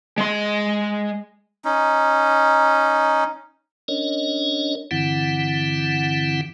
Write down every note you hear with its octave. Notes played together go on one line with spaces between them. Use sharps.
G#3 C6
C#4 D#4
C#4 D4 A#4 C#5 D#5
G2 D3 E3 C4 E4 F#5